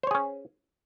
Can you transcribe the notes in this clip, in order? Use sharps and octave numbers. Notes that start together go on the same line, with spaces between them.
C#4 G#4 C5 C#5